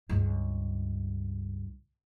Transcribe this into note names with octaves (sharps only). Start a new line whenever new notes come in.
C#2 G2